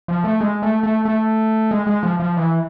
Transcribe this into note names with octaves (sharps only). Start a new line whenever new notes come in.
F3
A3
G#3
A3
A3
A3
G#3
G#3
F3
F3
E3